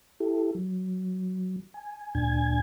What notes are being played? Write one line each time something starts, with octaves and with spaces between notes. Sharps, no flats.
E4 G4 A4
F#3
G#5
D2 A#2 D4 G#5 G#6